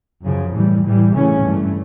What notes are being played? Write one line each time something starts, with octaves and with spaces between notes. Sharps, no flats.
F#2 C#3 F3
A2 E3 G3
A2 E3 G3
C#3 E3 A3 C#4
G2 E3 A3